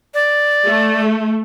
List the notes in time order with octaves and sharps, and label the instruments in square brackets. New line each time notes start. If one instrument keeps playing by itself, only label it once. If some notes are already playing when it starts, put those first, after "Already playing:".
[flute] D5
[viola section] A3